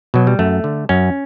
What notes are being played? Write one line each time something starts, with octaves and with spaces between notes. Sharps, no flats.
B2 F#3
G3
F#2 A3
D3
F#2 C#4